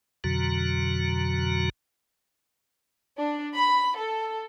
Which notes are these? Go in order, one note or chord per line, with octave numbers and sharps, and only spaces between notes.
F2 B2 D3 F#3 F#4 A#5
D4
B5
A4